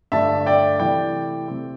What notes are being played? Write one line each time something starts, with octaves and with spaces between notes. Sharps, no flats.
G2 D3 A3 D4 E5 A5
D5 G5
C3 E3 A3 D5 G5
C3 A3 C4